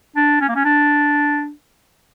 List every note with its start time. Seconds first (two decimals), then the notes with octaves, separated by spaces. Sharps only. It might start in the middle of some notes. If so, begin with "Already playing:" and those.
0.16 D4
0.41 C#4
0.49 A#3
0.56 C#4
0.65 D4